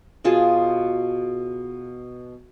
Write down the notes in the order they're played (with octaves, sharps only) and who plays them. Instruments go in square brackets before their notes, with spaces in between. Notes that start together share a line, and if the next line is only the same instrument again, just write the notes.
[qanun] B2 F4 G#4 A5